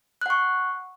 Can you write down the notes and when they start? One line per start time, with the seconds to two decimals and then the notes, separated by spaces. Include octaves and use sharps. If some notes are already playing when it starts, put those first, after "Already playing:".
0.21 F#6
0.26 F#5
0.30 C#6